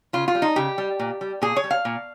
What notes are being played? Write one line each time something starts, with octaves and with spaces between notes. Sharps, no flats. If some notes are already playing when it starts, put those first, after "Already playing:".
C#3 F4
F4
G3
D#4
C#3 G4
G3
A#2
G3
A#2 G#4
C#5
G3
F5
A#2